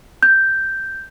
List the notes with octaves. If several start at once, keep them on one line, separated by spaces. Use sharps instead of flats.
G6